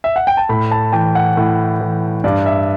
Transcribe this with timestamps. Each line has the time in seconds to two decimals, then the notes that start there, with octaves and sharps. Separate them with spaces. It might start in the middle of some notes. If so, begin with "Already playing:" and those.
0.04 E5
0.16 F#5
0.27 G5
0.37 A5
0.49 A2 B5
0.71 A5
0.92 E3 G5
1.15 F#5
1.37 A2
1.81 E3
2.24 G2 D5
2.46 E5